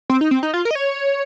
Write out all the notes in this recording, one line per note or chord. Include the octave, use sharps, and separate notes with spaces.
C4
D#4
C4
D#4
F4
A#4
D#5
C#5